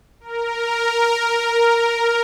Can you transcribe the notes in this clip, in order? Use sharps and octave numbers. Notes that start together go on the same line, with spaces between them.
A#4